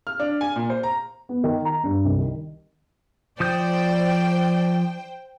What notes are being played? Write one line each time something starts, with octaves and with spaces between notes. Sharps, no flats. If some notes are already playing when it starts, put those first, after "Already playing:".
F6
D4
G#5
A#2
C5
A#5
B3
D#3
A#5
G2
C2
D#3
F3 C5 D5 G5 D#6 G6